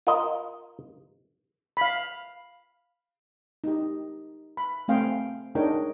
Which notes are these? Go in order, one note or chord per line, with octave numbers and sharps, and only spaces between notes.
F4 A#4 D#5
F5 B5
D#4 G4
B5
A3 C4 F5 G5 G#5
D4 D#4 G#4 A#4 C#5 G5